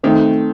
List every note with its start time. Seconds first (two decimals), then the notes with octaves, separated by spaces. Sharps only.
0.03 D#3 A3 C4